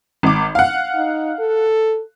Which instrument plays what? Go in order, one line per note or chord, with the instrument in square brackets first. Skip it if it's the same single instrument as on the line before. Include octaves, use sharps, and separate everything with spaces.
[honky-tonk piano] G#1 D6
F5 F#5
[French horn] D#4
A4